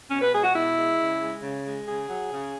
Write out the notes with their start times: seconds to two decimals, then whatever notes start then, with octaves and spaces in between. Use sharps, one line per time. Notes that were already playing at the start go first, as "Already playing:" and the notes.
0.10 B2 C#4
0.21 B4
0.32 G#3 G#4
0.43 F#4
0.54 B2 E4
0.77 G#3
0.99 C#3
1.21 G#3
1.42 C#3
1.64 G#3
1.87 C#3 G#4
2.09 F#3
2.31 C#3